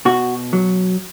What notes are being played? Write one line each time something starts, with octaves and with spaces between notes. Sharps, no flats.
B2 F#4
F#3